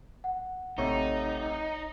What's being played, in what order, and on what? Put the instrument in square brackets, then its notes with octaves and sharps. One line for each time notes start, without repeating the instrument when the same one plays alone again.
[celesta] F#5
[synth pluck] A1 C#5 [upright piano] C3 A3 [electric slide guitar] D#4